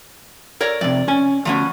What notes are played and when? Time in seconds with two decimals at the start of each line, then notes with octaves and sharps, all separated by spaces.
0.61 A#4 C#5 D5
0.81 F2 C3 D5
1.08 C#4 G#5
1.45 D2 F3 B3 C#4